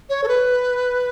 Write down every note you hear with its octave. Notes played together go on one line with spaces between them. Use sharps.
C#5
A4
B4